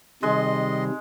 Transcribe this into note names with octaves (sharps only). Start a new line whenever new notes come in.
C3 D#3 G3 G#3 D#5 C6